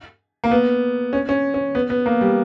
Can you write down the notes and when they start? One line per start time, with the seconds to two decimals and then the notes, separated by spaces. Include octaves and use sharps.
0.44 A#3
0.51 B3
1.13 C#4
1.29 C#4
1.54 C#4
1.75 B3
1.90 B3
2.06 A#3
2.21 G3